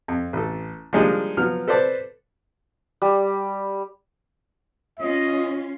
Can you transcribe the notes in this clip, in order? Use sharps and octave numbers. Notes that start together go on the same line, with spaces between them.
F2
A1 A4
F3 G3 G#3 A#3 D4 D#4
F3 F#3 B3 F6
A4 B4 C5 D5 A5
G3
C#4 F4 D#5